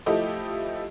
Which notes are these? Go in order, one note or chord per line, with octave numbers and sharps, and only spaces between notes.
F3 A3 E4 G4 D#5